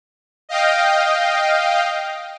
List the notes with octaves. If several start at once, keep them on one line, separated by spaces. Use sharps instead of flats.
D#5 F5 G5